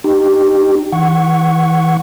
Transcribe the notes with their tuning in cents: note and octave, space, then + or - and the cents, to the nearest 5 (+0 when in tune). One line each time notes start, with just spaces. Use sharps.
D#4 -40 G4 -10
E3 -20 F#5 +0 C#6 +0